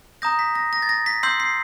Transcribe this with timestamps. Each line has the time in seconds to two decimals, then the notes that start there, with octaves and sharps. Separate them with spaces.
0.22 A#5 D#6 G6 A#6
0.39 B6
0.55 A#6
0.73 A#6
0.82 A6
0.89 A#6
1.06 B6
1.23 C6 E6 G6 C7
1.40 C7